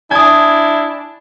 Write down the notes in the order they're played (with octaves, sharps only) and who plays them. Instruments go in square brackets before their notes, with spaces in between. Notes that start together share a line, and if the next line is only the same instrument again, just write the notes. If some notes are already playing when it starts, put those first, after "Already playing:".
[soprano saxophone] D4 [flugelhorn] E4 [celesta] G#5 D#6 [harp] G#6